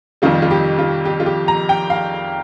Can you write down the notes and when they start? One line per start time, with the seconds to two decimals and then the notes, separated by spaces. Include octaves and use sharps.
0.22 F2 C3 D#3 G3 F4
0.42 F4
0.51 G4
0.79 F4
1.05 G4
1.20 F4
1.26 G4
1.48 A#5
1.69 G5
1.90 F5